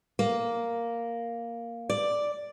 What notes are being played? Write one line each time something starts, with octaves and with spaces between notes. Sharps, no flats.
A#3
D5